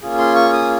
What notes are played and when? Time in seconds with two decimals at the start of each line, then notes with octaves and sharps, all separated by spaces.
0.02 A#3 C#4 F4 G#4
0.18 C6
0.35 C#6
0.53 D#6